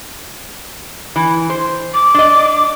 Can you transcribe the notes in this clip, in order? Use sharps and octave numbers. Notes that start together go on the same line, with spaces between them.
E3
C5
D6
D4 D#5